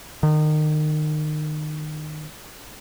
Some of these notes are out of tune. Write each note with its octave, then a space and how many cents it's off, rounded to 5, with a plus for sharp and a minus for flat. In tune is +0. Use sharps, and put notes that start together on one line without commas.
D#3 -30